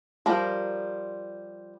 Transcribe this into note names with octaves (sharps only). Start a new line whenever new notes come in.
F3 G3 A#4